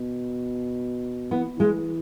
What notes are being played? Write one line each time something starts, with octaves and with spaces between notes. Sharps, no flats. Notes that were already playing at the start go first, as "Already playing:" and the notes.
Already playing: B2
E3 B3
E3 G#3